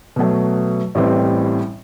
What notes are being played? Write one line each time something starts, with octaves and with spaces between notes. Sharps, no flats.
B2 F#3 A3
A1 A2 E3 G3 C4